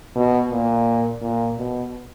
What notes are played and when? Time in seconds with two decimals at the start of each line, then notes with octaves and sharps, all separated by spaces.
0.15 B2
0.51 A#2
1.21 A#2
1.58 B2